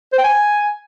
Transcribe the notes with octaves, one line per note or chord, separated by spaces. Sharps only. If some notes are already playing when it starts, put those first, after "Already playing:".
C5
G5
G#5